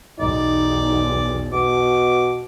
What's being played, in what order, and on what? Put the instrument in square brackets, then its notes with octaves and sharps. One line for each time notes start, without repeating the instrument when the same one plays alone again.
[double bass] B1 E2 [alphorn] D#4 [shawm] D5
[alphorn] B2 [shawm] D6